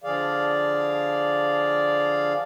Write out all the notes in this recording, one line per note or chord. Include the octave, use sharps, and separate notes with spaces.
D3 F3 G#4 D5 F5